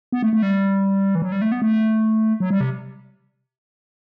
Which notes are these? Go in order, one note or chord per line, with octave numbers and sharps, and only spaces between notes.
B3
A3
A3
G3
E3
F#3
G3
A3
B3
A3
F#3
G3
C3